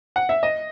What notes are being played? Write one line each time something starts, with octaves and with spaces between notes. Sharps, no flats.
F#5
E5
D#5